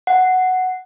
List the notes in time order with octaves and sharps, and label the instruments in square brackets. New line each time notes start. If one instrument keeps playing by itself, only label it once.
[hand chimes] F#5